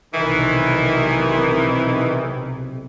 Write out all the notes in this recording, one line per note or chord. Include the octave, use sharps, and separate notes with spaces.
B1 C3 D#3 E3